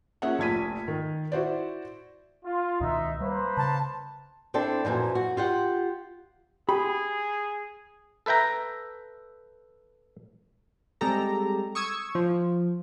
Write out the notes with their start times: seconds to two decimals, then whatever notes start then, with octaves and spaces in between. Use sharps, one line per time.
0.22 A#3 C#4 G#4 E5 F#5
0.39 F1 A#1 G#6 B6 D#7
0.88 D#3
1.32 E4 F#4 C5 D5
2.44 F4
2.81 C#2 B2 D#3 D#4 E5
3.20 G3 A#3 B4 C5
3.57 C#3 A5
4.54 C4 D4 E4 A4
4.85 F#2 A#2 E3 F3
5.15 F#4
5.37 F4 G4 F#5
6.69 G4 G#4 B5
8.26 A4 B4 E5 G5 A#5
11.01 G3 G#3 C4 G4 A4 A#5
11.75 C#6 D#6 E6 G#6
12.15 F3